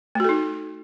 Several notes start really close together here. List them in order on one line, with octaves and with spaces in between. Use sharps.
A3 F#4 A4 D#4